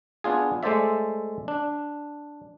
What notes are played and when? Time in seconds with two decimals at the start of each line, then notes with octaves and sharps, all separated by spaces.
0.24 B3 D4 F4 G#4
0.63 G#3 A3 A4 C5 D5 E5
1.48 D4